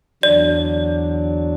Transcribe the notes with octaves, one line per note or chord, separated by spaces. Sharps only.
E2 D3 F#3 D4 D5